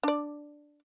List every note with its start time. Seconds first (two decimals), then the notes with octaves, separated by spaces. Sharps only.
0.03 D4 D5